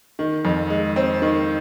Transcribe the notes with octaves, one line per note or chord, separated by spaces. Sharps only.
D#3
F2
G#3
C4
D#3